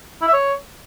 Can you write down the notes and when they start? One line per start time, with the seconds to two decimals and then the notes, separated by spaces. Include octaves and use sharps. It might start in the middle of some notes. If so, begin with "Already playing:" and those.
0.22 E4
0.28 E5
0.33 C#5